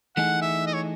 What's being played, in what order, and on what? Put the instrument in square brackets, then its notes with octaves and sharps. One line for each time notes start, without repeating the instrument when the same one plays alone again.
[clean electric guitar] E3 A3 D#4 G#4 [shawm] F#5
[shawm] E5
D#5
C#5